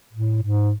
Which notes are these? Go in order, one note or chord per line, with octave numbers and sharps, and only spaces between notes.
A2
G#2